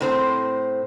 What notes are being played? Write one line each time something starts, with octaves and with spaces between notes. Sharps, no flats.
A2 C4 C5